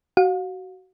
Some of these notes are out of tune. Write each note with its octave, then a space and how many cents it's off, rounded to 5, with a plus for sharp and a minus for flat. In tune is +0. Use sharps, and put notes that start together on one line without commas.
F#4 +20 F5 +40